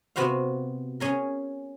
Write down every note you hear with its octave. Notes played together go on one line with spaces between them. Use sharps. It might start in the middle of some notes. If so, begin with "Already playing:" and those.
C3 B3 F#4 C5 F5
C#4 G#4 A#4